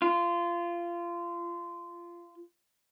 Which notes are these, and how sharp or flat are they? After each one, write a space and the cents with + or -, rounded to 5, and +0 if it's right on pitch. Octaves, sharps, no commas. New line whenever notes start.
F4 -20